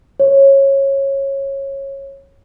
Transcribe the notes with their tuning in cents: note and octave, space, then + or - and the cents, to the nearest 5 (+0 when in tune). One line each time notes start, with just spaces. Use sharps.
C#5 -20